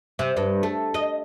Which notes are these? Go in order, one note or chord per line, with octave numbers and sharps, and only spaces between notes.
C3
G2
A3
D#5